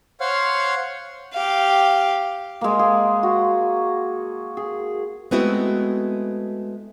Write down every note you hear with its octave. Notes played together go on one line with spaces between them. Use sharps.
C5 C#5 F5 F#5 F6
G4 F5
G#3 A#3
G#4
F#4
G#4
G#3 A3 B3 C4 E4 F#4